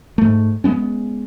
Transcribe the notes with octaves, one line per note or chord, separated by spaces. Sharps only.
G#2 A3
G#3 A#3 B3 C#4